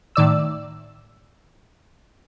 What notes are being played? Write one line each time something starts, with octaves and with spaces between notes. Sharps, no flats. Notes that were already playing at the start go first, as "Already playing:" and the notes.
A2 D#3 D5 E6